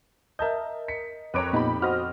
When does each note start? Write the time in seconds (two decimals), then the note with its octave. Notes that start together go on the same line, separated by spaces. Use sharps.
0.39 A#4 D#5 E5 A5 G6
0.88 B6 C#7
1.34 F2 B4 C#5 A#5 D6 D7
1.53 A#2 B3 D#4 G4 B5
1.82 F#4 C5 D#5 F6